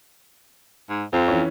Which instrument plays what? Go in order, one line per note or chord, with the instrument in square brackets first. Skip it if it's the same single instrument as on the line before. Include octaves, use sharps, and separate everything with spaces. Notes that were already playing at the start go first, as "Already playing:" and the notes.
[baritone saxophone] G#2
[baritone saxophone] F2 [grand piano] C5
[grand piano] E3 C#4